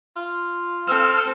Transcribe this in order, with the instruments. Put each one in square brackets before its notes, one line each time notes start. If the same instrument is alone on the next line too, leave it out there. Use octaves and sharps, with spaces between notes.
[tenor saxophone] F4
[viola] C4 A4 [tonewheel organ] E6 F6